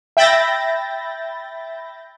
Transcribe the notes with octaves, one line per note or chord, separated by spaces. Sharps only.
E5 G5 B5 G6 A6 A#6